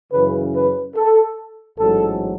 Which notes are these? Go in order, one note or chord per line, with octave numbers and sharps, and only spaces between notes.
F#2 C#3 E3 B4
B4
A4
A1 G#2 F#3 A4